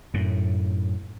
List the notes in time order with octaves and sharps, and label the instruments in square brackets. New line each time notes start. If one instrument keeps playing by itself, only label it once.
[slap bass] F#2 A2